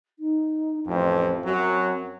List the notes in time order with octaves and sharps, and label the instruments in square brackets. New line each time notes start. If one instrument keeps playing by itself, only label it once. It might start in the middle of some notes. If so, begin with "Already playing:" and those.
[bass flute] D#4
[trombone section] A1 F2 [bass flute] C5
[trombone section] F#2 F#3 [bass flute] C4